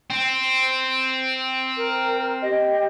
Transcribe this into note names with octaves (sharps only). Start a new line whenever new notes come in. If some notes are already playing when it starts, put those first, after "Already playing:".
C4
A#4
G4 D#5